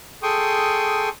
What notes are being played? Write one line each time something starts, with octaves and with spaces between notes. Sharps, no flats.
G#4 A4 G5 C6 C#6 D#6